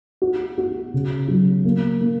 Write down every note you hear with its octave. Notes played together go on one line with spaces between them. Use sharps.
F#4
F#4
C#3
F#3
A#3
A#3